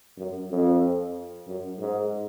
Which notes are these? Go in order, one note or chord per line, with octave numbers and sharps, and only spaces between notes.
F#2
F2
F#2
G#2